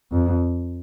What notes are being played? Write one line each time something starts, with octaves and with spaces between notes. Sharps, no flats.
F2